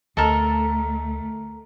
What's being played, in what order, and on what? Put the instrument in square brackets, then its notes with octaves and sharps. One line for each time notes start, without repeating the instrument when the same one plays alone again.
[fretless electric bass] D2 [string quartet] A3 [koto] A4 [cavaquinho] A#4 D#5